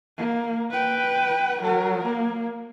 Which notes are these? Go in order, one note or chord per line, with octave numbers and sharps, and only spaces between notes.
A#3
B4 G5
F#3 A#4
A#3